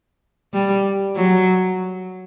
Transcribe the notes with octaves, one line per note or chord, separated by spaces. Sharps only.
G3
F#3